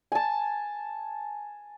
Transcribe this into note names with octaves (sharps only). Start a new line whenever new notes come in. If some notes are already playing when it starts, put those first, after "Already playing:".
G#5 A5